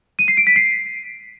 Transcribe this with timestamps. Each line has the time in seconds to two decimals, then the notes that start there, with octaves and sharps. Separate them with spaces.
0.19 D#7
0.28 C7
0.37 D7
0.47 B6
0.56 C7